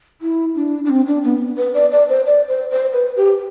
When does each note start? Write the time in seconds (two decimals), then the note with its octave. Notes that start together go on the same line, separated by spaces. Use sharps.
0.22 E4
0.55 D4
0.85 D4
0.90 C4
1.07 D4
1.24 B3
1.57 B4
1.74 D5
1.91 D5
2.09 C5
2.26 D5
2.48 C5
2.71 C5
2.93 B4
3.17 G4